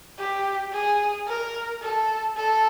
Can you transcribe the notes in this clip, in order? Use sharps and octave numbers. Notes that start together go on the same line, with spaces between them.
G4
G#4
A#4
A4
A4